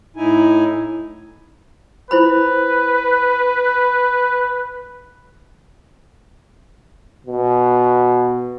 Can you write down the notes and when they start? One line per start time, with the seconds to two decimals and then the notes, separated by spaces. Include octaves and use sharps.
0.16 A2 D#4 E4 G#5
2.11 E4 B4 C5 B5
7.26 B2